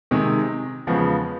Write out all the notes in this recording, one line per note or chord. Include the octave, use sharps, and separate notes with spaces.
C3 D#3 G#3
E2 C#3 F3 G#3 B3